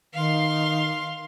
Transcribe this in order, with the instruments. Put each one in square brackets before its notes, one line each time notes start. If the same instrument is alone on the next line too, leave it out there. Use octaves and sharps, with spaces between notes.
[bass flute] D#3 [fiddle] F5 C6